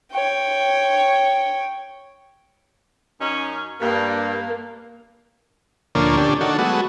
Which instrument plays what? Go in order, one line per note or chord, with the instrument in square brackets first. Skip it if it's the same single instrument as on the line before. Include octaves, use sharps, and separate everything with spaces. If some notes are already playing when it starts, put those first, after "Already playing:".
[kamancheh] C#5 G5
[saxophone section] F#2 C#4 D#4
[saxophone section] G2 [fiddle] A#3
[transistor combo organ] D2 A#2 F3 A#3 D4 C#5
D3 C#4 D4 G4
D#3 D4 F#4 A4 C#5
F#3 G#3 A3 B3 F#4